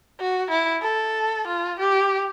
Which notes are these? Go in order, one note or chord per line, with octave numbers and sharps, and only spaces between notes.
F#4
E4
A4
F4
G4